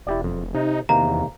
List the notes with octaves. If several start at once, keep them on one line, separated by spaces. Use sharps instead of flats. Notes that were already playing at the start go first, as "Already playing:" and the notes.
E1 E4 G4 D5
F2
C3 D#4
E2 C3 D#3 A#3 A#5